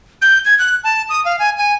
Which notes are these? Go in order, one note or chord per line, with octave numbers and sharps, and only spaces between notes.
G6
G#6
F#6
A5
D#6
F5
G#5
G#5